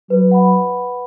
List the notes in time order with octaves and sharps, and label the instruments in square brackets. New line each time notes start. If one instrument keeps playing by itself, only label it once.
[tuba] F#3 [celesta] B4
[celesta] F#5 B5